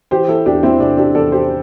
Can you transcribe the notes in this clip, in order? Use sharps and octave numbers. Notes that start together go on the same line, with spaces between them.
E3 G4 C5
E4 A4
E2 D4 G4
C4 E4
C3 D4 G4
D4 G4
E2 A4 D5
G4 C5